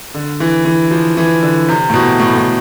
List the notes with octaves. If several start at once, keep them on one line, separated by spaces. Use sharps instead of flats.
D3
E3
E3
F3
E3
D3
C3
A2
B2
A2
A2